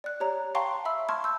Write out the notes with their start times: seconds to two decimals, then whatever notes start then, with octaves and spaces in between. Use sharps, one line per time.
0.04 D5 F#6
0.20 G4 C#5 A#5
0.55 F5 G5 A5 A#5 C6 C#6
0.85 E5 B5 E6
1.09 A5 C6 C#6 F6 G#6
1.24 E6 G6